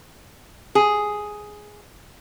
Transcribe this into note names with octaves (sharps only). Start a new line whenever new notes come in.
G#4